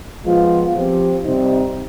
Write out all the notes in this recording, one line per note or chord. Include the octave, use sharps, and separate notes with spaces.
F3 G#3 B3 F4
F3 C4 G4
C3 G3 C4 D#4